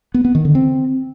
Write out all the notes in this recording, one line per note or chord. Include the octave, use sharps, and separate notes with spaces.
B3
B3
D#3
D3
C4